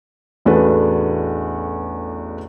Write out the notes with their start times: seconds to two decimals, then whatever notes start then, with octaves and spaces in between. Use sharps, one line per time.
0.45 A1 E2 D4 F#4 A4 B4